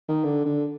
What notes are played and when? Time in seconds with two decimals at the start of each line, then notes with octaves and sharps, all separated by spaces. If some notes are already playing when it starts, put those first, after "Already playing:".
0.09 D#3
0.24 D3
0.45 D3